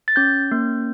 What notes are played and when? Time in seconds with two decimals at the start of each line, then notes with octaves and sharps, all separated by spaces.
0.08 A6
0.16 C#4 G6
0.51 A#3